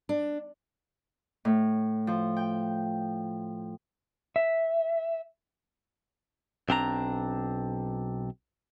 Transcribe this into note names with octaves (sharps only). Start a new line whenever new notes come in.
D4
A2
F3
G5
E5
B1 C4 D4 A#5